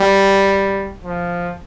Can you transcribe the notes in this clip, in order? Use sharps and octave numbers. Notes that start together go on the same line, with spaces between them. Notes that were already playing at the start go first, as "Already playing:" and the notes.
Already playing: G3
F3